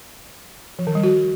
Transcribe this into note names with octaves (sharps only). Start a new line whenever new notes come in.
F3
D#3
G3
F#4